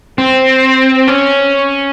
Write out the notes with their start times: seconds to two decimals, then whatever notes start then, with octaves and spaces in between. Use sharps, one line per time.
0.18 C4
1.08 C#4